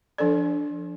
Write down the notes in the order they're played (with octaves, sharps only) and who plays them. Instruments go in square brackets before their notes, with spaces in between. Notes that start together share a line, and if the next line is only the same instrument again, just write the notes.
[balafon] F3 D4 A4 D5